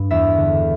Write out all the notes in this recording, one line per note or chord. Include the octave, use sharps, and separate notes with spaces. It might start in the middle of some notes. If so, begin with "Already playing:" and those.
Already playing: G2
E2 E5
D3